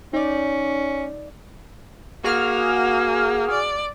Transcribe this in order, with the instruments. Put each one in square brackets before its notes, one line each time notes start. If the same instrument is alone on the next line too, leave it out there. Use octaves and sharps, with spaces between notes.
[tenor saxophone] C#4 [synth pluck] D#4 D5
[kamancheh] A#3 [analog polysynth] F#4 G#4 F6
[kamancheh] D5